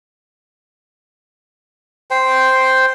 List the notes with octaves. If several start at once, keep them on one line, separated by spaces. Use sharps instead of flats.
C5 G5